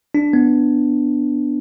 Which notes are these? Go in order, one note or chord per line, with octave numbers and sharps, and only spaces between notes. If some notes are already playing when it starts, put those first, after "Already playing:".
D4
B3